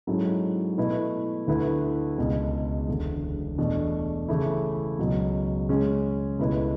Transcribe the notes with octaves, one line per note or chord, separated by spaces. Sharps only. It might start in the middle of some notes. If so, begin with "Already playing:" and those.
G#2 F#3 C#4 E4 A4
B2 A3 E4 B4
D2 D3 A3 E4 B4
C#2 B2 G#3
E1 D2 D3
E1 E2 B2 A3 D4
C#3 E3 A3 E4
C#2 B2 F#3
C#3 G#3 C#4 G#4 C#5
C#2 B2 A3 E4 B4